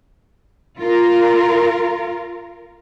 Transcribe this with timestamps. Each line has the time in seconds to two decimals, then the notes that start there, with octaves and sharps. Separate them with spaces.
0.79 F4 A#4